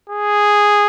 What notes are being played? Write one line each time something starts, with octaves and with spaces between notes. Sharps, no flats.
G#4